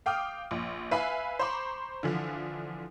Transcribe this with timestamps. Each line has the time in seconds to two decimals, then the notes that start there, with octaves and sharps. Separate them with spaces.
0.06 F5 G5 D6 D#6 F6
0.51 A#1
0.91 B4 E5 F5 G#5 B5
1.39 C5 A#5 B5 C#6 D6
2.03 D3 E3 F3